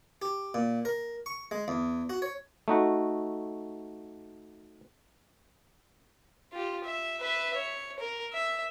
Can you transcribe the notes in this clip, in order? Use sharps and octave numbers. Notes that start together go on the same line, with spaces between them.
G4
A#2
A#4
C#6
G#3
E2
F#4
C#5
A3 D#4 F#4
F4 G4
E5
B4 E5
C#5
A#4
E5